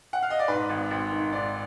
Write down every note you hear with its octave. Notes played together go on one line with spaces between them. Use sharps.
F#5
F5
D#5
D5
G#2 B4
G#1
G#1
D#3
G#2 D5